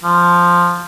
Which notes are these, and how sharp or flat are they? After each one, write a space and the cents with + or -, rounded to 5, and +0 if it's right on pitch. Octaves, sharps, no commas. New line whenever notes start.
F3 +0